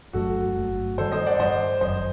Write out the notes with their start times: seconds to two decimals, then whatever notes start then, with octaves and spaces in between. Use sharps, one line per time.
0.13 G1 G2 F#3 A3 F#4 A4
0.56 G1 G2 F#3 A3
0.98 G2 D#3 G3 A4 C5
1.12 C5 D#5
1.26 D5 F#5
1.39 G2 D#3 G3 C5 D#5
1.81 G1 F#2 F#3 C5 D#5